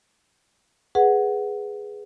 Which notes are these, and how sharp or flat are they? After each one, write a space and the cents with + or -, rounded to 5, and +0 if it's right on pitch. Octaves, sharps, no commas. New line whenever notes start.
G#4 +0 B4 +0 F#5 +0